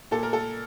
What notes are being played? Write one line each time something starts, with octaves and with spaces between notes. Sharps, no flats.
A#2 A4
A#4
A4